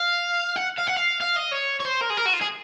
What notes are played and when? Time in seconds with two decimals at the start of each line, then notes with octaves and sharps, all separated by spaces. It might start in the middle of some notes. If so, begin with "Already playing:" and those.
Already playing: F5
0.56 F#5
0.78 F5
0.87 F#5
0.96 F5
1.21 F5
1.37 D#5
1.52 C#5
1.80 C#5
1.85 C5
2.01 A#4
2.10 G#4
2.17 A#4
2.26 F#4
2.33 F4
2.41 G#4